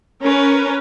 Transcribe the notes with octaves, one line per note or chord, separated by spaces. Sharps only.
C#4 A#4 B4